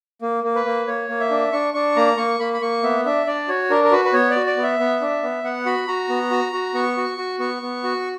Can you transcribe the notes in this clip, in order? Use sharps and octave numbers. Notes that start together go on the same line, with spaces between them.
A#3
A#3
B4
A#3
A#3 C#5
A#3
E5
D4
D4 C#6
D4 C#6
A#3 A#5
A#3 C#6
A#3 B5
B5
A#3 C#6
B3 E5
D4 E5
D4 D5
F#4 C#5
D4 A#4
A#4
F#4 B4
B4
B3 C#5
D5
F#4
D5
B3
E5
B3
D4
B3
B3 F#5
F#4 B5
F#4 A#5
B3
F#4
F#4
B3 C#6
F#4
F#4
B3 C#6
B3
F#4